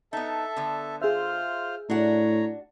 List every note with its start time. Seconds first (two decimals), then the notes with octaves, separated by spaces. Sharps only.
0.13 B3 D#4 A4 E5 A5
0.56 D3 B3
1.02 F4 G#4 C5 E5 F6
1.90 A2 D4 F#4 C#5 A#5